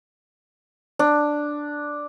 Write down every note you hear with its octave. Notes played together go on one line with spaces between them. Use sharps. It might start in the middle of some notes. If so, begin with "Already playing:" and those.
D4